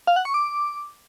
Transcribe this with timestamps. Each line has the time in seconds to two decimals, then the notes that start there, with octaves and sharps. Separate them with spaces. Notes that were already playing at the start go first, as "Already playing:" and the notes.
0.07 F5
0.16 F#5
0.25 C#6
0.34 D6